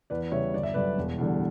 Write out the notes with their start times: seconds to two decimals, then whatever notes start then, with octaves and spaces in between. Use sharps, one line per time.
0.10 E2 B4 D5
0.32 C#3 G3 C#5 E5
0.54 G1 D5
0.63 E5
0.74 F#2 D3 G3 B4 D5
0.98 E1
1.18 E2 D3 G3